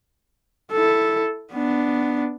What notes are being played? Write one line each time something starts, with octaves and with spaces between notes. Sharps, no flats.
E4 A4
B3 D4